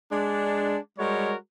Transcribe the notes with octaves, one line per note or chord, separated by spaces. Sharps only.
G#3 D4
G3 G#3 F#4 A#4 C#5